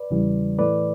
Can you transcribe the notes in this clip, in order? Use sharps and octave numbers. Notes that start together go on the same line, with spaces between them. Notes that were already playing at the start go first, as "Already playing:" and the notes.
Already playing: B4 D5
E2 C#3 E3 G3
A2 E3 A3 B4 D5